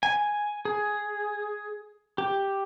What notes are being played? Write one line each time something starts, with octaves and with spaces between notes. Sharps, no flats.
G#5
G#4
G4